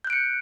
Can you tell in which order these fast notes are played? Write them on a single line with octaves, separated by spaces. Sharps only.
G6 F#6 D7 C#7